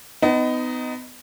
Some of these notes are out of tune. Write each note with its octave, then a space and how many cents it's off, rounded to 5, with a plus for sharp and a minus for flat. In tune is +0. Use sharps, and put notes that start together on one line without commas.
B3 +30 D#4 +0